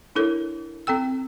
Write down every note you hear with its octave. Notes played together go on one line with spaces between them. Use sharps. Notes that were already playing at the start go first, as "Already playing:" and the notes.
D4 E4 A4 A#4 C#5
C4 A4 G5 E6